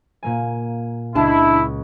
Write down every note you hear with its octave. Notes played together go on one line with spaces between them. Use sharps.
A#2 A#3 G#5
C#2 D4 E4 A5